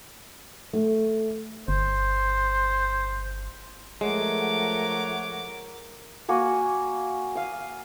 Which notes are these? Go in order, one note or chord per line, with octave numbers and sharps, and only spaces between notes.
A3
G1 C5
F3 G#3 A3 A#4 C#5 F#5 D6
A#3 F#4 G#5
F5 D#6